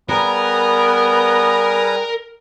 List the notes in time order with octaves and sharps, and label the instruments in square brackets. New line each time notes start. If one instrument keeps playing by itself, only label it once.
[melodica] G3 G#4 B4 [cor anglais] B3 [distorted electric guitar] A#4